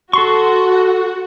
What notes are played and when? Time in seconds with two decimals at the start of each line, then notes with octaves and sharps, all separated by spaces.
0.13 F#4 A4 C6 C#6